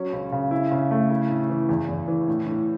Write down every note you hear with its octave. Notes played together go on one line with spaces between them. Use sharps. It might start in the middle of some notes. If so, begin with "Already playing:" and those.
Already playing: F#3 C#4
C#2
C#3
E4
C#3
A3
E4
A2
E3
E2
E2
E3
A2
A2